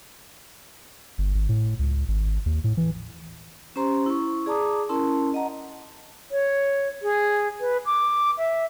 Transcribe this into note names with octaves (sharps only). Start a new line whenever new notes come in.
G1
G#1
A2
C#2
G#1
D#2
A2
E3
C#4 G4 C5 A#5 C6
E4 C#6
G#4 D5 A5 A#5 D6 D#6
C#4 E4 A#4 A5 C6
D#5 F#5 A#5
C#5
G#4
B4
D6
E5